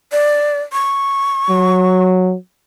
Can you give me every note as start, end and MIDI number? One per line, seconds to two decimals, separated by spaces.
0.12 0.60 74
0.73 2.04 85
1.49 2.35 54